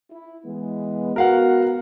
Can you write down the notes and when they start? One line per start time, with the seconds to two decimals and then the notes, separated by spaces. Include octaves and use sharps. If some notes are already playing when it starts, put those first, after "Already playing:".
0.11 E4
0.45 E3 G#3 B3
1.16 B3 F#4 A#4 F5 F#5